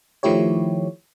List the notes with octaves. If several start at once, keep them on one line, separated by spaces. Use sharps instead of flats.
D#3 F3 A3 E4 G4 C#5